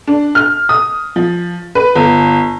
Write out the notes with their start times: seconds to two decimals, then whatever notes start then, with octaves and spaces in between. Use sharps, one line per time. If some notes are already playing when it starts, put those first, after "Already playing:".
0.08 D4
0.35 F6
0.69 D#6
1.16 F3
1.75 B4
1.95 G1